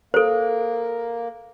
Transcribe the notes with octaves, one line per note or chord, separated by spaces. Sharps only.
A#3 A4 C5